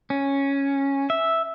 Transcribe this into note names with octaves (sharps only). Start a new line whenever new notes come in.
C#4
E5